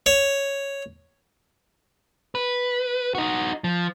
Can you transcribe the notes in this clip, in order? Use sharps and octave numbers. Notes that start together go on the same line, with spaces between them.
C#5
B4
D#4 F#4
F3